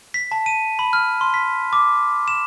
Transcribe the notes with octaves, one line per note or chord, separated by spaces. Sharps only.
B6
A5
D#7
B5
F6
C6
B6
D6
E7